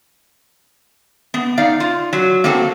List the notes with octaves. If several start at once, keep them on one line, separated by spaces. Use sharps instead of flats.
B3
D#4 D5 F5
F4
F#3
A#3 C4 F#4 A4